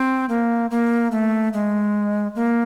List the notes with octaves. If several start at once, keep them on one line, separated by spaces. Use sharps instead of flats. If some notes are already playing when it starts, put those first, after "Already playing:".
Already playing: C4
A#3
A#3
A3
G#3
A#3